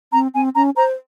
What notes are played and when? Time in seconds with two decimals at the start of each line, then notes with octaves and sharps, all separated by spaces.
0.12 C4 A#5
0.34 C4 G#5
0.55 C#4 A#5
0.76 C5 A#5